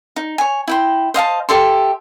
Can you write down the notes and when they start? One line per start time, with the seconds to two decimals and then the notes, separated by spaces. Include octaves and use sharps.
0.16 D#4
0.38 C#5 G#5
0.68 E4 G5 C6
1.14 C5 D#5 F5 A5
1.49 G4 A4 E5 C6